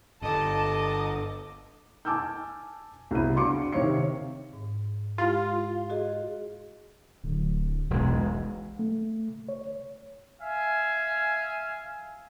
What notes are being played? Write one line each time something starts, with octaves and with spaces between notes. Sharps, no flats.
G1 A4 D#5 A5 D6
G#5 A5 D6 E6 F6 G6
C2 C#3 B3 D#7
D4 F#4 F5 C6 D6 C#7
C3 D#3 C#5 F5 C#7
G#2
G#3 E4 F4 G4
F#4 G#4 D#5
D1
E1 B1 G#3
A3
C#5
E5 F5 G#5